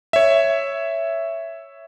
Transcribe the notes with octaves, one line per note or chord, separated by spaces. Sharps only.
C#5 E5